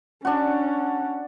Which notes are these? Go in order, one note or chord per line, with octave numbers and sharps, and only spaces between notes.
C#4 D4 F#4